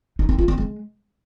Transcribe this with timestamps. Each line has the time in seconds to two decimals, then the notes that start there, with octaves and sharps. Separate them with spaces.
0.19 D#4
0.29 C4
0.38 F4
0.48 C4
0.58 G#3